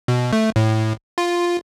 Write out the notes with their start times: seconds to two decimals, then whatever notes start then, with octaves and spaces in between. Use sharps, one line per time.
0.08 B2
0.33 A3
0.56 A2
1.18 F4